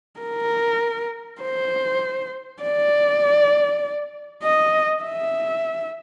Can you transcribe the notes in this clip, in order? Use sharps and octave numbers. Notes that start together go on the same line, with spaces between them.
A#4
C5
D5
D#5
E5